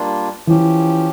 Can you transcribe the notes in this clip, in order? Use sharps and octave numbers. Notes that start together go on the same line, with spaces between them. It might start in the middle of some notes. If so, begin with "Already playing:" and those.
Already playing: G3 A#3 D4 F4
E3 F3 C#4 G4